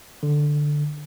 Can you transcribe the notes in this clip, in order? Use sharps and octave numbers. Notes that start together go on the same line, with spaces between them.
D3